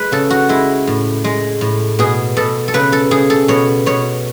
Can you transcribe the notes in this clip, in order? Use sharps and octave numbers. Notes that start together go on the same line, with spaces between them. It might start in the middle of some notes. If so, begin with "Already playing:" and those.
Already playing: G#3 B4
C#3 A4
F#4
G#3 E4
A2
G#3
A2
B2 G#4
B2 A4
A4
C#3 B4
A4
C#3 G#4
A4
B2 C#5
B2 C#5